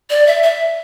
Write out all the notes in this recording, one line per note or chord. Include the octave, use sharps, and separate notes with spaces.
D5
E5
E5